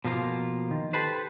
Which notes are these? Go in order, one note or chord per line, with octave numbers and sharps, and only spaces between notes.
B2 F3 A#3 F4
D#3
G4 A4 B4 C5